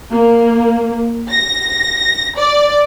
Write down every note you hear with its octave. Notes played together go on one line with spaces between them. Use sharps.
A#3
A#6
D5